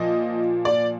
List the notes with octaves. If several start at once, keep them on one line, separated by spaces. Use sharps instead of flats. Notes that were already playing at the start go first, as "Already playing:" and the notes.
Already playing: A#2 F3 D#5
D5